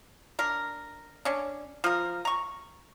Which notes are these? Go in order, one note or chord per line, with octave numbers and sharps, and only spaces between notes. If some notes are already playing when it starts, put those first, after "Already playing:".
D4 A#4
C#4 D4
F3 A#4
A#5 C#6